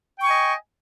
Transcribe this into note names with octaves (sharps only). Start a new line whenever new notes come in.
D#5 G5 G#5 C#6